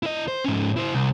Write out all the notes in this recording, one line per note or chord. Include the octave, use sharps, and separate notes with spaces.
E4 D#5
C5
G#2 C#4
E4 C5
C2